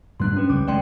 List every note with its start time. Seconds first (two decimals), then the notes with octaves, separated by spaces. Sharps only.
0.20 G2 G3 D4 C6 F#6
0.37 C#4 B4
0.49 C#2 G3 D6
0.68 D2 G#3 D5 G5 C6